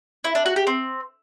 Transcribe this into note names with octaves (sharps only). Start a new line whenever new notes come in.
E4
D4
F#4
G4
C4